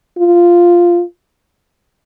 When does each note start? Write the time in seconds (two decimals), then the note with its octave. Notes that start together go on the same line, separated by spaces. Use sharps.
0.18 F4